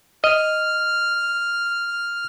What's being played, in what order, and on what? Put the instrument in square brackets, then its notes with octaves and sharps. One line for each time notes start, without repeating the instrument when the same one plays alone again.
[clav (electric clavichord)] D#5 [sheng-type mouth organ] F6